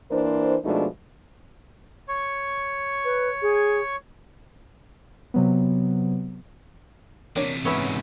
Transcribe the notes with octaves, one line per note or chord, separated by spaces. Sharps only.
E3 A#3 D4 A#4 C5
B2 F3 G#3 A3 D4 D#4
C#5 C#6
B4
G#4
C3 F#3 B3
E2 C3 A#3 D4 C#5
G#2 E3 B3 C#4 B4 C#5 E5